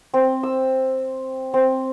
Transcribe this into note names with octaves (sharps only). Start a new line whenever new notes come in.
C4
E6
C4